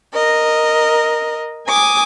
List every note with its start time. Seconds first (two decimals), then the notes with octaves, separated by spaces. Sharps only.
0.14 A#4 D#5
1.68 G#5 D6 D#6